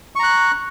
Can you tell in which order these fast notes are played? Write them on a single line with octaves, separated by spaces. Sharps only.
C#6 A#5 F#6